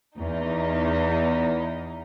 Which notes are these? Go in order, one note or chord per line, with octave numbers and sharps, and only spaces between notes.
E2 D#4